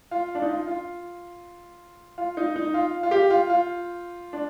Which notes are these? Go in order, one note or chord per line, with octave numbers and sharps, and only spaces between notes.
F4
D4
D#4
F4
F4
F4
D#4
D#4
F4
F4
G4
F4
F4
D4